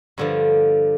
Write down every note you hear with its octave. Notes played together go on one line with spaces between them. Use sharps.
G2 D3 F3